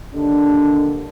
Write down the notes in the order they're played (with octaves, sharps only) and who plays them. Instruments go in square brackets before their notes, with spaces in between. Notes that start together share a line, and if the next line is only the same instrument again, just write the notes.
[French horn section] D#2 D3 D4